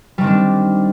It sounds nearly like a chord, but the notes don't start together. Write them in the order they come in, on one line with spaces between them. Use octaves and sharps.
G3 D#3 C4 D4